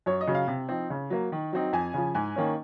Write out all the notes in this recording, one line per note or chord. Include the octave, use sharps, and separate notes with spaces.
F#2 C#5
D#5
C#3 F#3
F5
C3
F3 C4 D#4
C#3
F#3 A#3
D#3
F#3 C4 D#4
F2 G#5
C#3 F3
G#2 G#5
D#3 A#3 C#4